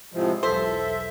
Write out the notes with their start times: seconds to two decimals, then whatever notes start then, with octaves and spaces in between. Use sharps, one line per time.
0.13 A2 C3 F3 G#3
0.43 B1 E2 A4 C5 E5